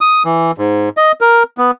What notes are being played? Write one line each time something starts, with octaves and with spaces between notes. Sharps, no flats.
D#6
E3
G#2
D#5
A#4
B3